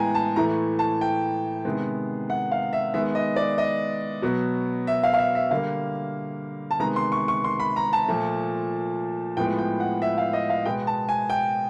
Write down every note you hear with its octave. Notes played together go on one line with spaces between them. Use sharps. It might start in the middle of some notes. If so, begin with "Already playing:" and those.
Already playing: A2 E3 G#3 B3 G5 G#5 A#5
A5
A2 E3 A3 A#5
A5
G5
C3 D#3 G#3 B3
F#5
F5
E5
D#3 G#3 B3 E5
D#5
D5
D#5
B2 F#3 B3
E5
F5
F5
E5
E5
D3 G3 A#3 F5
A5
C3 D#3 G#3 B3 A#5
C6
C#6
C#6
C6
B5
A#5
A5
A#2 F3 A3
A2 F3 G#3 B3 G5
G5
F#5
E5
F5
D#5
F5
B2 G#3 B3 G5
A5
G#5
G5